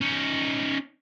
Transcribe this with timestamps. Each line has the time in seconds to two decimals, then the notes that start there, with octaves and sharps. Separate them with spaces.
0.01 C#4 D#4